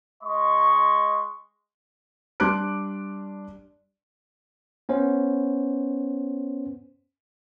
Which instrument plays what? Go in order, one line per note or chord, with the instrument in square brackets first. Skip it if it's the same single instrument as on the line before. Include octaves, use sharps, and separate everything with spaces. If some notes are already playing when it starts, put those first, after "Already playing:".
[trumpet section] G#3 D#5 C6 C#6
[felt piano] G3 D4 C6 D6 F#6 D7
[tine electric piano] B3 C#4 C5